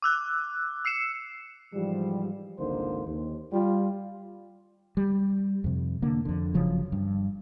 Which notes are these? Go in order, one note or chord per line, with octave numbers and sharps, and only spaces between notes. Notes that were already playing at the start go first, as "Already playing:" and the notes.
D6 E6 F#6
E6 C7 C#7 E7
G#2 E3 F3 G3
G#1 C#2 D3 A#3 D#4 C5
D#2
G3 F4
G3
F2 C3
D3 A#3
F2 D3
F#1 C#3 F3 F#3
G2